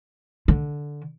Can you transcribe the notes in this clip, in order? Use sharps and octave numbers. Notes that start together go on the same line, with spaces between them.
D3